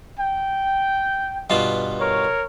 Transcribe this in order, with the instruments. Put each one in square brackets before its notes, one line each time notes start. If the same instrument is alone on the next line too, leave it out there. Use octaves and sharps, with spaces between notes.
[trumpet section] G5
[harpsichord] G2 B2 F4
[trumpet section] A#4 C#5